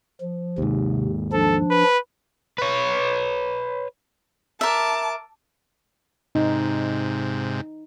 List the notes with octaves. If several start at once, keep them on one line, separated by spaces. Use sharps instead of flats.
F3
D#2 G#2 C3
F3 D4 A4
B4
B4 C#5
A#4 E5 A5 D6
G#2 C3 D#4